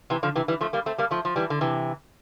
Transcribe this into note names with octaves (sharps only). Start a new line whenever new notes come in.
C3 E3
D3 F3
C3 E3
E3 G3
F3 A3
G3 A#3
A3 C4
G3 A#3
F3 A3
F3
E3 G3
D3
C3 E3